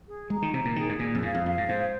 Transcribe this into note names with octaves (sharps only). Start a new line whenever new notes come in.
G#4
G#3 A#5
D#3
C3 A#5
A#2
D#3 G#4
G#2
A#2 G#4
F2
G#2 F5
F2
F2 F5
G#2
G#2 C5